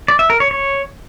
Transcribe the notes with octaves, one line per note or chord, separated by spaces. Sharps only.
D5
E5
A#4
C#5
C#5